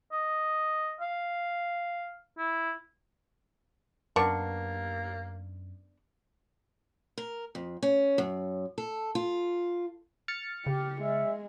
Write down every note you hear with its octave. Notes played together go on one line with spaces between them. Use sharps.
D#5
F5
E4
F#2 A#3 B3 D4 A#4 C#6
A#4
F2
C#4
F#2
A4
F4
F6 A6 C#7
C#3 G4
G#3 E5